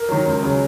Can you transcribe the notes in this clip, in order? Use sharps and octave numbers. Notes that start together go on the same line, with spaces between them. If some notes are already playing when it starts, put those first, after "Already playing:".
Already playing: A#4
D#3 F#3
C#2
C#3 F#3